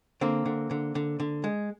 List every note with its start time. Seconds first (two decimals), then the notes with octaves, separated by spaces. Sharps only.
0.21 D3 A#3 C4
0.46 D3
0.71 D3
0.95 D3
1.20 D3
1.44 G#3